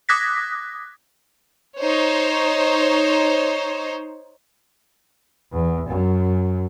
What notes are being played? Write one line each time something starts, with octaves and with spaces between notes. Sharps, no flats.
D6 D#6 F#6 G#6 A#6 B6
D#4 C5 C#5
E2
F#2